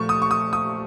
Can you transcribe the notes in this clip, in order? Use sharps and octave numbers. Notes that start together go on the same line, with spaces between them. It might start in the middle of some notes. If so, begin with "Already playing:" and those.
Already playing: A#2 F3 A3 C#6
D#6
C#6
D#6
D#6